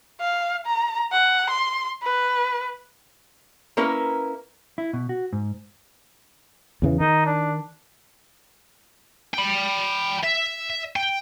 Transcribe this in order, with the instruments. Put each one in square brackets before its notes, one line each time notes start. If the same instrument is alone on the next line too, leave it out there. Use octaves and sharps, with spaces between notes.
[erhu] F5
A#5
F#5
C6
B4
[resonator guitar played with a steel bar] A#3 C#4 E4 A#4 B4
[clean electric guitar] E4
B2
F#4
G#2
[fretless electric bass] E2 C#3 E3
[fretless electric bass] D#3 [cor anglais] D#4
[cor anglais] D4
[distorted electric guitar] G5 B5
E5
G5